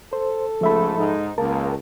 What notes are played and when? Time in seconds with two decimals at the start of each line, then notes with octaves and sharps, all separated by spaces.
0.13 A4 C5
0.61 C#2 G#2 F3 A3 E5 B5
0.97 G#2 D#4
1.38 C#2 A#3 A#4 A5